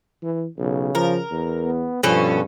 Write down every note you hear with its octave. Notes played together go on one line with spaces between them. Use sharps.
E3
B1 C#3
F3 A#4
E2
B3
G2 B2 F3 C#4 A4